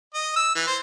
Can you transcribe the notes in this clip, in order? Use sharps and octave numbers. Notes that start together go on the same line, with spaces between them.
D#5
E6
E3
C5